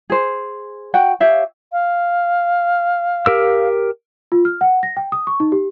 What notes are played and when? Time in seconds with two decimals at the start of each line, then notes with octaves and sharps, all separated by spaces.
0.10 G#4 C5
0.94 F#4 F#5 G5
1.20 G4 C#5 E5 F5
1.72 F5
3.26 G4 A#4 E6
4.32 F4
4.45 F6
4.61 F#5
4.83 A#6
4.97 G5
5.12 D#6
5.27 C#6
5.40 D#4
5.52 G4